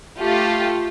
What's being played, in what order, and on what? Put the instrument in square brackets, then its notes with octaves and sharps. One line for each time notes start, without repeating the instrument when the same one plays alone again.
[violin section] A3 F4 G4